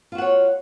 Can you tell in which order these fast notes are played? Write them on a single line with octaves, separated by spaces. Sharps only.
F4 F#4 F#5 C#5